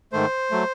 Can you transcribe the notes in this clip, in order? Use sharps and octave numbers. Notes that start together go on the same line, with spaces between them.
G#2 D#3 A3 C5
F#3 A3